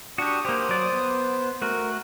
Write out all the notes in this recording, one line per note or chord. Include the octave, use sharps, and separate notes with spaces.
D4 F#4 G4 C#6 D#6
A#3 G4 C5
F#3 D5
B3
A3 F#4 A#4